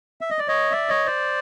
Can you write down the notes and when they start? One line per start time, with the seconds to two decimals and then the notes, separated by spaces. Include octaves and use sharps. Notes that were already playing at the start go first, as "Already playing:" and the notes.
0.21 E5
0.30 D#5
0.39 D5
0.48 C#5 D#5
0.72 D5 E5
0.89 C#5 D#5
1.06 C5 D5